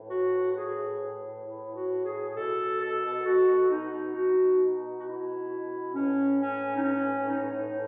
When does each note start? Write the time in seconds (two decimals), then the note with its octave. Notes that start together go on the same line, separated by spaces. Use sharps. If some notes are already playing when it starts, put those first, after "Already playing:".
Already playing: A2 E3
0.09 F#4
0.49 F#4
0.55 G#4
1.44 E4
1.74 F#4
2.04 G#4
2.27 G#4
2.33 B2 A4
2.79 A4
3.24 F#4
3.69 D#4
4.13 F#4
4.58 D#4
4.99 F#4
5.04 E4
5.93 A2 E3 C#4
6.38 C#4
6.75 D#4
6.83 C#4
7.29 D#4